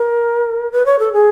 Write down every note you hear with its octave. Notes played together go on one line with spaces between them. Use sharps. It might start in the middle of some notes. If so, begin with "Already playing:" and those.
Already playing: A#4
B4
C#5
A4
G#4